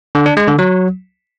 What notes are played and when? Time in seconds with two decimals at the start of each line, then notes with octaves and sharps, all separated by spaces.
0.15 D3
0.26 D4
0.37 G#3
0.48 D3
0.59 F#3